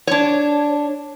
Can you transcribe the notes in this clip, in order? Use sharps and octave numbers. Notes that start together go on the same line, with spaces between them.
D4 C#5